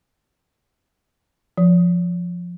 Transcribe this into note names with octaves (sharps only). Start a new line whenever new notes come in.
F3